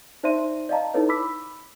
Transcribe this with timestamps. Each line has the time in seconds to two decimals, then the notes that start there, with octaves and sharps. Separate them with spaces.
0.23 D#4 C5 D5 E5 C6 D#7
0.69 D5 D#5 F5 A5 A#5
0.94 D#4 E4 A4 B4 C#5
1.09 B5 D6 E6 B6